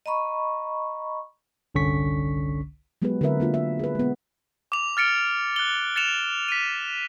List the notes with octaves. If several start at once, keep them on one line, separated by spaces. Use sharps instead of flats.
D#5 A#5 B5 C#6
G1 C2 D3 C#4 C#6 B6
F#3 G#3 B3 G4 G#4 B4
D3 C4 E4 A#4 B4 E5
A#3 D4 F4 F#4
E5
G#4 B4
G#3 B3
D6 F7
F6 A6 C#7 D7 G7
F#6 G7
A6 C#7 E7 F7
B6 D#7